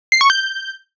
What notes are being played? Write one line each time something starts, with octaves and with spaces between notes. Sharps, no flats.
C7
C#6
G6